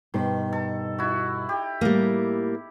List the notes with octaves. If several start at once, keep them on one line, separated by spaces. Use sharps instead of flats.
G2 B2 D#3 C5
A4
E4 F#4
G4
A2 G3 A3 A#3